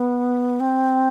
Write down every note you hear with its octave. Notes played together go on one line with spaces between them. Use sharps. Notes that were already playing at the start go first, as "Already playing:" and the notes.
Already playing: B3
C4